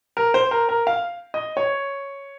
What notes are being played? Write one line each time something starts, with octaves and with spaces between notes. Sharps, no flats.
A#4
C5
A#4
A#4
F5
D#5
C#5